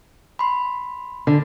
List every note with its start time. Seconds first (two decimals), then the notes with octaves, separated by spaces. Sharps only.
0.39 B5 C6
1.27 D3